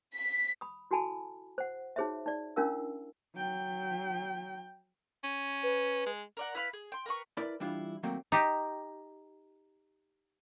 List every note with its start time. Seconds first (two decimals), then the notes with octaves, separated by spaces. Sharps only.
0.16 B6
0.61 B5 D#6
0.91 E4 F#4 A4 G#5 A5 B5
1.58 C5 F#5
1.96 D#4 F#4 G#4 C5 C#5 E5
2.26 D#4 D5
2.56 C#4 D4 E4 A#4 F5 E6
3.36 F#3 G5
5.24 C#4
5.63 B4
6.06 G#3
6.37 A#4 D5 F#5
6.55 E4 B4 F5 B5
6.73 G#4
6.92 G5 C6
7.06 A#4 B4 B5 C#6
7.37 E4 A#4 B4 D5 B5
7.60 E3 G3 D4 E4 F4
8.03 D#3 F#3 A3 A#3 C4
8.32 D#4 G4